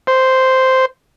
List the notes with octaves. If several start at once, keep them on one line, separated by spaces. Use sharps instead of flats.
C5